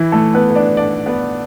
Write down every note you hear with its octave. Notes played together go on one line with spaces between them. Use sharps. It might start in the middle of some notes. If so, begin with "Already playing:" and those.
Already playing: E3 E4
A3 A4
B3 B4
B4
D4 D5
D4 D5
B3 B4